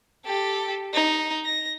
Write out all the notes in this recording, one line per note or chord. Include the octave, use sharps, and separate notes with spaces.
G4 A4
D#4
A#6